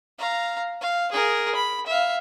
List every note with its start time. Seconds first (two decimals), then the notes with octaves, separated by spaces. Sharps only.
0.18 F5 A#5
0.81 F5
1.12 G#4 A#4
1.55 B5
1.87 E5 F5